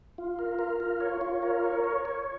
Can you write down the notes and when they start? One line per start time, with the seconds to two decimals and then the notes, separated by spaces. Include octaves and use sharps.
0.18 F4
0.39 A#4
0.59 A#4
0.80 F4
1.00 C#5
1.21 F4
1.42 A#4
1.64 C#5
1.84 C#5
2.05 C#5